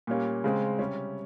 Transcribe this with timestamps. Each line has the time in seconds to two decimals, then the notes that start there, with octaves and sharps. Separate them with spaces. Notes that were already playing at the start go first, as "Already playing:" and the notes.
0.07 A#2 G3 A#3 C#4
0.44 C#3 G#3 C4
0.79 C3 G3 C#4